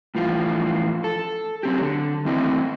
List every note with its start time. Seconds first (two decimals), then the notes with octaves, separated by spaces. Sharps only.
0.15 A2 E3 F3 F4
1.04 A4
1.63 F#3 C4 G4
1.82 D3
2.25 E2 D#3 A3 C4 E4 D#5